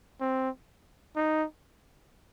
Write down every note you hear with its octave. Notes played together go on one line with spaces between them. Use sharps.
C4
D#4